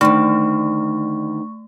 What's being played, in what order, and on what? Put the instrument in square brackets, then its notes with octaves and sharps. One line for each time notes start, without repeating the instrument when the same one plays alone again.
[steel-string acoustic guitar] D2 G2 D#3 [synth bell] A3 [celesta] C#6